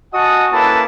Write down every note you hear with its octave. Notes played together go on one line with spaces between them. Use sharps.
F#4 D#5 F#5 G#5 A5 D#6
A#3 C#4 E4 A4 B4 A5